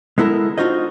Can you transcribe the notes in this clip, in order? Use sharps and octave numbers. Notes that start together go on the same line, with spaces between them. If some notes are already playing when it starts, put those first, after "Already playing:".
G#3 B3 E4 A4 A#4
D4 D#4 F4 F#4 C5 D#5